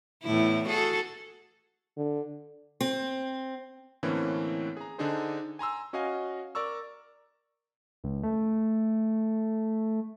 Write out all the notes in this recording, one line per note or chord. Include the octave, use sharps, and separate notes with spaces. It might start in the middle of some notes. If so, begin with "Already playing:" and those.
E2 A2 E4
F#4 G#4 A4
D3
C4
A2 D3 E3 A#3 C4 C#4
G#4 A#5
D3 D4 D#4 G#4 C5
G#5 A#5 C6 E6
C#4 F#4 D#5 F5 G#5
A#4 D5 A#5 C#6 E6
C#2
A3